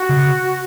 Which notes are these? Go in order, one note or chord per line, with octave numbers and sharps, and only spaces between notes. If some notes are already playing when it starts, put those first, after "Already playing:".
Already playing: F#4
C#3